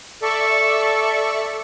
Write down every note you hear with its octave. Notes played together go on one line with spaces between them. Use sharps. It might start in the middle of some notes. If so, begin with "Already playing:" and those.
A4 D5 E5 C#6